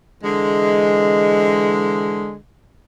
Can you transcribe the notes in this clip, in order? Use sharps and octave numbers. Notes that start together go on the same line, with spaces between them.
D3 E3 G#3